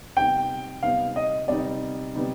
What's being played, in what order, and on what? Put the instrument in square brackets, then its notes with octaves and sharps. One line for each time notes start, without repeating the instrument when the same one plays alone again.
[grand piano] C3 G3 B3 D#4 [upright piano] G5
[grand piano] C3 G3 B3 D#4 [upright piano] F5
[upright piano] D#5
[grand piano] C3 G3 B3 D#4 [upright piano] D5
[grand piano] C3 G3 B3 D#4